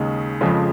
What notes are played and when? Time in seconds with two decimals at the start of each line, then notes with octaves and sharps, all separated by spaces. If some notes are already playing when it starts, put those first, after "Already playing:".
Already playing: D#2 C#3 G#3 D#4
0.41 F2 C#3 F3 G#3